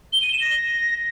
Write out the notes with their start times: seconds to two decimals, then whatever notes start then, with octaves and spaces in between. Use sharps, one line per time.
0.13 G7
0.22 D#7
0.32 E7
0.41 A#6